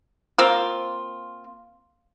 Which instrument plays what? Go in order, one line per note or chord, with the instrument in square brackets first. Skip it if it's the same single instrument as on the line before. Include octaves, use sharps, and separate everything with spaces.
[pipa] A#3 C4 F4